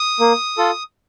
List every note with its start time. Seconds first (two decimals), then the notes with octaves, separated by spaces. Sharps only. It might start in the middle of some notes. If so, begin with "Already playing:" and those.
Already playing: D#6
0.20 A#3
0.57 F4 A4